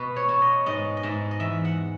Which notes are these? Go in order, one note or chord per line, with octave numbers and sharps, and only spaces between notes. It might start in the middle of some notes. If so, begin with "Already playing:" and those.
Already playing: B2 B4
C#5
B2
D#5
G#2 D#5
D#5
G#2 E5
D#5
E2 E5
F#5